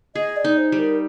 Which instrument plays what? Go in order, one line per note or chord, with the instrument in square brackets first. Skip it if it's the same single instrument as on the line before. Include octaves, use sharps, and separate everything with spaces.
[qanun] G#4 [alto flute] D#5
[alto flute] D5
[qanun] D#4
[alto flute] C5
[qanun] G3
[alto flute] A#4